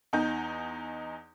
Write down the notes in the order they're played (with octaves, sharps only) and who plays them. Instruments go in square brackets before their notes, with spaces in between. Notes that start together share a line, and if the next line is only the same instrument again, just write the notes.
[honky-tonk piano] E2 D#4 G6